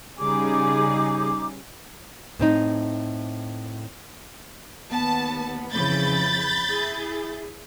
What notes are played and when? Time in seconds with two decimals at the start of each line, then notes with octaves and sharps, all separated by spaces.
0.19 C#3 G3 D#4 G#4 D6
2.39 A2 C4 D#4
4.91 D#2 B3 A5
5.71 F2 C#3 E3 B5 G6 A6
6.69 E4 G#4